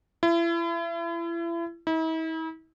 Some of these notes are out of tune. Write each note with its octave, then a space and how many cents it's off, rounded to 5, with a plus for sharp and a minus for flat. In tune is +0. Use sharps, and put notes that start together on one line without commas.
E4 +35
E4 -45